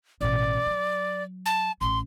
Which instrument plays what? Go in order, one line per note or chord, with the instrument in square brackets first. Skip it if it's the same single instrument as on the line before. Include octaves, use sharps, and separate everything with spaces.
[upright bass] A1 B2 [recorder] D5
[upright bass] F#3
[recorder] A5
[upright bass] A1 [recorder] C6